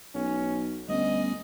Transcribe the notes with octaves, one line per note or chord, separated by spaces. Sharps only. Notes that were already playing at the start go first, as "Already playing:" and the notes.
B1 C#4
D2 G3 B3 C#4 D#5